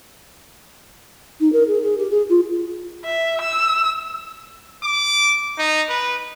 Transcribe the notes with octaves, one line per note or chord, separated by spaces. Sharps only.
D#4
A#4
G#4
G#4
G4
G#4
F4
E5
E6
D6
D#4
B4